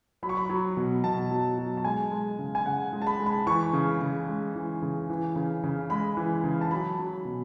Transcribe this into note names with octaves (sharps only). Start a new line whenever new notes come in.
F#3 B5
C#6
B5
F#3
B2
B2 A5
F#3
F#3
A5
G#3 G#5
G#3
C#3
G#5
C#3 F#5
G#3
A5
B5
G#3
B5
E3 C#6
C#3
C#3
G#3
E3
C#3
E3
C#3
C#3
G#3 B5
E3
C#3
A5
F#3 B5
F#3
B2